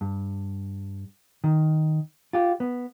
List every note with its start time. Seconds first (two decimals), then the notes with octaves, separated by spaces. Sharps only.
0.01 G2
1.44 D#3
2.33 F4 G4
2.60 B3